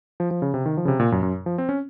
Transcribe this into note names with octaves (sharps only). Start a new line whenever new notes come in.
F3
F3
C#3
C3
D#3
F3
C#3
C3
A#2
F#2
F#2
F3
C4
C#4